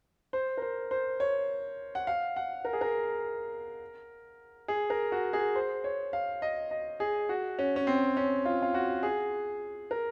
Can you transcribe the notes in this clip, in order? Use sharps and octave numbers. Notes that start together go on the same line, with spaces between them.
C5
A#4
C5
C5
C#5
F#5
F5
F#5
A#4
G#4
A#4
G#4
A#4
F#4
G#4
C5
C#5
F5
D#5
D#5
G#4
F#4
C#4
C#4
C4
C#4
F4
F4
F#4
G#4
A#4